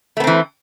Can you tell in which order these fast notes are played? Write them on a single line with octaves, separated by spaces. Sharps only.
A3 B3 C4 E3